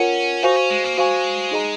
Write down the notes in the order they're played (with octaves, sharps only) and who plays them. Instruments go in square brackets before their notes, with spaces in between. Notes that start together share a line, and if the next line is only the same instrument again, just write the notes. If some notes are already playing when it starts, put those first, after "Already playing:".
Already playing: [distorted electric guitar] C#4 [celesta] F4 A#4 C#5 F#5
[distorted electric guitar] D#4 [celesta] F#4 C5 F5 G#5 C#6
[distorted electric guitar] C#4
G#3
A#3
[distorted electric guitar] G#3 [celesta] F#4 C5 F5 G#5 C#6
[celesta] D#4 G#4 D#5 A#5